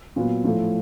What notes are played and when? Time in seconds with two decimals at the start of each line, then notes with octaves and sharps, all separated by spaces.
0.16 A#2 F#3 B3
0.44 A2 F3 A3